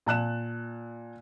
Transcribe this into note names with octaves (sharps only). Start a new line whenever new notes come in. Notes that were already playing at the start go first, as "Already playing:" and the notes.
A#2 A5 F#6 E7